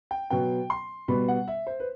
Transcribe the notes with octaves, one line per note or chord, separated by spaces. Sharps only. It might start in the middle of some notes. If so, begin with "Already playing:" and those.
G5
B2 F#3 B3 G5
C6
B2 G3 B3 B5
F#5
E5
C5
B4